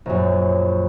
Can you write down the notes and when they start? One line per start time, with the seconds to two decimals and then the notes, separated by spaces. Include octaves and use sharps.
0.06 A#1 F#2